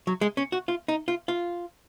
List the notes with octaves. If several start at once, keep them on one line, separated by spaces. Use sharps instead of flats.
F#3
G#3
C#4
F#4
F4
D#4
F4
F4